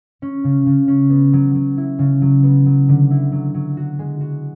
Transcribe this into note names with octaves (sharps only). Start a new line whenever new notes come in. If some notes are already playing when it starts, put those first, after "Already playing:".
C#4
C#3
C#3
C#4
B3
F#3
F#3
E4
C#3
F#3
B3
F#3
D3
E4
F#3
F#3
F#4
G#3
F#4